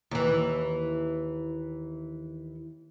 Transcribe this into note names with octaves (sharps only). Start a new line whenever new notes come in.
D#2 E3